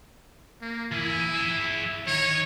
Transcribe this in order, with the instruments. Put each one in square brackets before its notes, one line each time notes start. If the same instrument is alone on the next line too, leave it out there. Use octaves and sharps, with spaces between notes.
[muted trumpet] A#3
[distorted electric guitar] E3 G#4 [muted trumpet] E4
[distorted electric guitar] G#4 E5
[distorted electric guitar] D#3 A#5 [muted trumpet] C#5